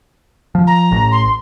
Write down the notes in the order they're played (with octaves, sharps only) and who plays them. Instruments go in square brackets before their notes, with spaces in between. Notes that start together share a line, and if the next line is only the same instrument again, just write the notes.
[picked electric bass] F3
[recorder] A#5
[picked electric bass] A1
[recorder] C6